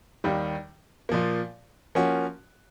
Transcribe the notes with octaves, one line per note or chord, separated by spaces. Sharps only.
D#2 D#3 G3
A#2 F3 A#3
F3 A#3 C#4 F#4